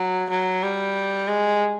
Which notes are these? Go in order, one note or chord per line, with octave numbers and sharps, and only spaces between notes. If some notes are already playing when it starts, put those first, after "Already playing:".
Already playing: F#3
F#3
G3
G#3